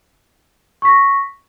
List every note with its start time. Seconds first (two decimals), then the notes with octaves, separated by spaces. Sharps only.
0.82 C#6
0.85 B6
0.88 A#6